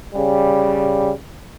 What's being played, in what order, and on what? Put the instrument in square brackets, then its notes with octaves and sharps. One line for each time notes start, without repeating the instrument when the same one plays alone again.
[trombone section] C#3 G3